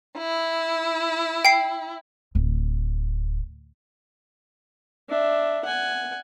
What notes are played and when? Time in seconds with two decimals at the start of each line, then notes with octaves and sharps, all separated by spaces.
0.17 E4
1.45 G5 C7
2.35 D1
5.09 D4 E5
5.65 F#5 G#5